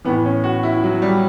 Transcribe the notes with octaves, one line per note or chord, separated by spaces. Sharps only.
A2 E3 B3
C#4
F#4
E4
F#3
G3